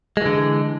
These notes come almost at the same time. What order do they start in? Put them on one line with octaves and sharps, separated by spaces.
G#3 E3 D3